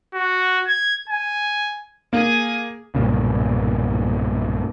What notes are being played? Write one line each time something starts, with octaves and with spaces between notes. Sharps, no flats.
F#4
G#6
G#5
A#3 G#4 G#5
B1 G2 A#2 C#3